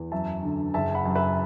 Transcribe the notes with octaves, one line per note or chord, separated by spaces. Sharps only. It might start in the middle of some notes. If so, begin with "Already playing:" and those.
Already playing: E2
F#2 E5 A5
D3
F#1 E5 A5
F#5 B5
F#2
B4 E5